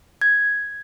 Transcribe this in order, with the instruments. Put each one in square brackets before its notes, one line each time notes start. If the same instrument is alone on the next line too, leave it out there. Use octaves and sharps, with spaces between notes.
[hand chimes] G#6